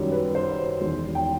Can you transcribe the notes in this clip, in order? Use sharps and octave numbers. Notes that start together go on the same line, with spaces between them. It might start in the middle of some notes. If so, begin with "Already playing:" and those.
Already playing: F#2 D#3 G3
B4
C5
E1 E2 D#3
G5